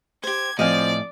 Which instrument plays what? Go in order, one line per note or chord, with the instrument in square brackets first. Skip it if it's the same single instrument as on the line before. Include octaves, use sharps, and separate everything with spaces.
[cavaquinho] G4 C5 [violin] G#6
[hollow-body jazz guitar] A2 [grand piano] F3 C4 [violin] D5 [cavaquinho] D#5 F5 G#5